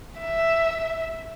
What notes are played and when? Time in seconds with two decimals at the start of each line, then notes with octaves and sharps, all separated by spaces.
0.21 E5